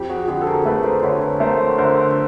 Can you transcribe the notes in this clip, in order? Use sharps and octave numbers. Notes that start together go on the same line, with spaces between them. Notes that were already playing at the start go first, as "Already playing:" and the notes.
Already playing: F2 G4
F#4 G#4
D3 F#4 G#4
A4
G#4 A#4
A3 A4 B4
A#4 C5
D3 B4 C#5
A3 A#4 C5
D3 A#4 C5